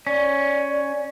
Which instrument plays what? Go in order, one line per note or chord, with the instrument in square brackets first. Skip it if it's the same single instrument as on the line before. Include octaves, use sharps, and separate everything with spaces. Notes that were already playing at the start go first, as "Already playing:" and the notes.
[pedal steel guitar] C#4 [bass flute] D5